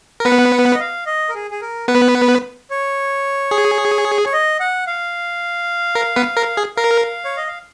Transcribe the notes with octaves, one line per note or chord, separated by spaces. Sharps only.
A#4
B3 B4 F#5
F#5
D#5
F5
D#5
A#4
G#4
G#4
A#4
B3 B4
C#5
G#4
C#5
D#5
F#5
F5
A#4
B3 B4
A#4
G#4
A#4 F5
C#5
D#5
F5